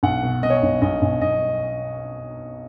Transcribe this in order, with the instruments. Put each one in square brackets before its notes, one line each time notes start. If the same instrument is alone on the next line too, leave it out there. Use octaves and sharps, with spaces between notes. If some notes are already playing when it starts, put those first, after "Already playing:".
[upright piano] B1 F#5
B2
B2 D#5
C#5
D#5
B1
B1 D#5
B1
B1 D#5